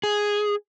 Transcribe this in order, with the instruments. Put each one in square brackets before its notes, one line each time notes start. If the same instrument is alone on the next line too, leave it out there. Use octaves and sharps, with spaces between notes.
[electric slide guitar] G#4